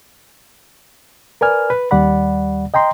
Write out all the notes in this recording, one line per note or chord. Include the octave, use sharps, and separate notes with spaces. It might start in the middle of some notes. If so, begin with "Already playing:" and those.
A#4 B4 D5 G#5 F6
B4
D#2 G3 D5 F#5 B5
D#5 G5 A#5 C6